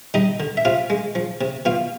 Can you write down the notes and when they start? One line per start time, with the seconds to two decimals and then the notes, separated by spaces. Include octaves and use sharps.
0.14 G3 D#4 D#5
0.40 D3
0.57 E5
0.65 C3 F4 F5
0.90 G#3
1.15 F3
1.41 C3
1.65 B2 F4 F5